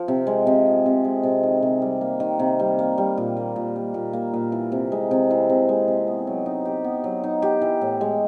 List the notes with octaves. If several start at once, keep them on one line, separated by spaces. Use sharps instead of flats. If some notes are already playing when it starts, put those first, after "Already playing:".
Already playing: F3
C3
G#3
C3
F3
C3
G#3
C3
D#3
C3
G3
A#3
D#3
C3
G3
A#3
G3
A#2
A#3
A#2
G3
A#2
A#3
A#2
E3
C3
G#3
C3
E3
C3
G#3
C3
B3
F#3
D#4
G4
B3
F#3
D#4
G4
E3
A2
G#3